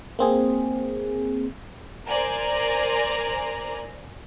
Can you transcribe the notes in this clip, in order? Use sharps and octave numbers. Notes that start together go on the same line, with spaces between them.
A#3 C4 G#4
A#4 C5 D5 G#5 A#5